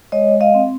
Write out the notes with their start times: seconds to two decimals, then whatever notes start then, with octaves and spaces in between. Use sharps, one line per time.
0.12 G#3 C#5 D#5
0.41 D#5 F5
0.54 C4